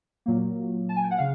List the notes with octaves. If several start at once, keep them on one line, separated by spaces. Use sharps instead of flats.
A#2 F#3 A#3
A5
G#5
G5
F#5
C#3 F5